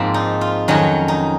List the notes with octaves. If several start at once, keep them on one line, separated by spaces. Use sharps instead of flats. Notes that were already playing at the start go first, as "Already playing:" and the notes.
Already playing: G#2 F3 A#3 C4
D#4
F4
F2 D#3 F#3 C#4
D#4